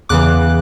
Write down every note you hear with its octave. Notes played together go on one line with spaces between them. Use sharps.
E2 C#3 E3 D6 F#6